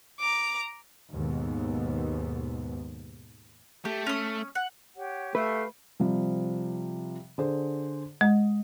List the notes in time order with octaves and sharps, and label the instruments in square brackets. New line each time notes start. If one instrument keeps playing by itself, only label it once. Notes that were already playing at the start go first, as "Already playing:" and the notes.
[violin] A#5 D6
[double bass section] D#2 G#2 B2 B3
[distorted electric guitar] A3 [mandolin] G4
[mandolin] C#4 D#6
F#5
[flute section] G4 C#5 F#5
[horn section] A3 [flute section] G4 F5 [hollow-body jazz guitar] B4
[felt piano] C3 F3 G3
D3 G#4 C5
[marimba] G#3 [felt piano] D#5